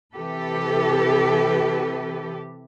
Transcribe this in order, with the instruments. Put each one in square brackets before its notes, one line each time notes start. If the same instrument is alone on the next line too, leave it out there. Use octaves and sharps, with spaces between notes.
[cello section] C3 E3 G4 A4 B4